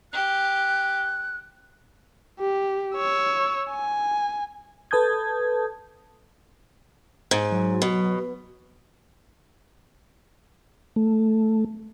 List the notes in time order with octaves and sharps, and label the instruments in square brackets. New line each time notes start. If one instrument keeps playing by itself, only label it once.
[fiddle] G4 [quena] F#6
[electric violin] G4
C#5 E6
G#5
[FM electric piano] A4 B4 A5 D#6 G6 G#6
[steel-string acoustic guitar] G#2
[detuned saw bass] F#3
[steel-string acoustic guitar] B2
[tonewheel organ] A3